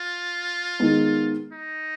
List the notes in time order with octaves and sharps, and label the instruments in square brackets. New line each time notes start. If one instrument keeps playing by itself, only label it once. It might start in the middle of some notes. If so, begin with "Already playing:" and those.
Already playing: [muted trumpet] F4
[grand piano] D#3 G#3 B3
[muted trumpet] D#4